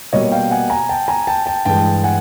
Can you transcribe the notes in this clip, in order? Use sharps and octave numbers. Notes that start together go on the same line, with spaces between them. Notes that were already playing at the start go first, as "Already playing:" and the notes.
B2 G3 A#3 C#5 D#5
F5 G5
F#5 G#5
G#5 A#5
G5 A5
G#5 A#5
G5 A5
G5 A5
G2 E3 G#3 G5 A5
F#5 G#5